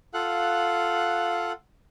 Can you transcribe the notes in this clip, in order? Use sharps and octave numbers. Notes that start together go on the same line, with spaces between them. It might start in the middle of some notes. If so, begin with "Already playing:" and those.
F4 A4 F5 F#5 F#6